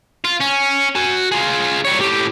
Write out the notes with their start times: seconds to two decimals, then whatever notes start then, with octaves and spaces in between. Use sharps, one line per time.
0.24 F4
0.40 C#4
0.95 F#4 G#5
1.32 F4 G#4
1.85 G3 C#5
1.99 A2 G4